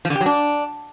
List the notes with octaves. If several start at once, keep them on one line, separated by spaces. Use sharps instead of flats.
F3
D3
G4
F#3
D4